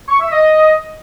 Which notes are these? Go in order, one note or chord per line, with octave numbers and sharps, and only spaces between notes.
C#6
E5
D#5